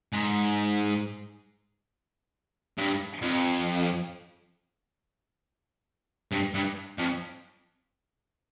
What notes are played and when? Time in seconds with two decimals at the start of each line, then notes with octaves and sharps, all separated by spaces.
0.13 G#2
2.78 G2
3.22 F2
6.32 G2
6.54 G2
6.98 F2